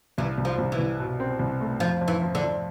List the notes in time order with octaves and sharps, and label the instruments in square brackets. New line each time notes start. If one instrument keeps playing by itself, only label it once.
[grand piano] C2 [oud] E3
[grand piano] C2
[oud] F3
[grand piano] C2
[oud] E3
[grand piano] C2
B2
C4
C2
A3
[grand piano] F2 [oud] F3
[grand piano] F2
[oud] E3
[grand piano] F3
[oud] D3
[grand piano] F3